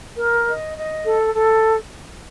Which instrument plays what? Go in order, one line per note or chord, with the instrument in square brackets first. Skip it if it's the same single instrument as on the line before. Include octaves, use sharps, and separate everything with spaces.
[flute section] A#4
D#5
D#5
A4
A4